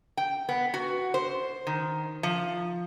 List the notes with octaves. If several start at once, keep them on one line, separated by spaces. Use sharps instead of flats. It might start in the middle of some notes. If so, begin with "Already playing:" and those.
G5
B3
F#4
C5
D#3
F3